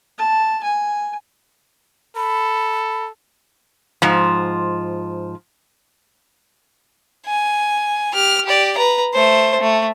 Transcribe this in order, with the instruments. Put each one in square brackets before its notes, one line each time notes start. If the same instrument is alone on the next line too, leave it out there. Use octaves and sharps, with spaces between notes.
[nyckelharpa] A5
G#5
[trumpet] A4 [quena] B5
[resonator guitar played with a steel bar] G#2 F3
[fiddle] G#5
G4 F6
G4 D5
B4 A#5
A3 C5
A3